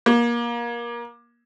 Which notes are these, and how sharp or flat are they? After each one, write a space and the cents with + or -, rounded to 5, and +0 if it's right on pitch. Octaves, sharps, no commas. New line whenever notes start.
A#3 +25